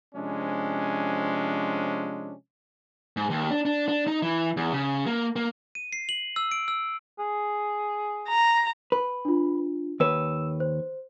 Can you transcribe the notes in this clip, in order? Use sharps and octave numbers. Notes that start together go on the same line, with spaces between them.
C3 F3 G#3 C#4 D4
G#2
D#2
D4
D4
D4
D#4
E3
E2
C#3
A#3
A#3
D#7
C7
F#7
E6
D7
E6
G#4
A#5
B4
D4 F4
D#2 B4 C#5 E6 E7
C5